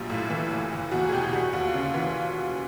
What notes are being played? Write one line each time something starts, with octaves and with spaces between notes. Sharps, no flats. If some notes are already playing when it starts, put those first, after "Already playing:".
Already playing: A#1 F#3 G3 F4
A2
E3
F#1
F#1
E2 F#4
G#4
B2 G4
G3 F#4
D#2 F#4
F4
C#3
E3 F4